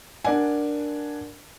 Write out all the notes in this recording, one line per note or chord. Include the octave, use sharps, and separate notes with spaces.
D4 A#4 D5 F#5 G#5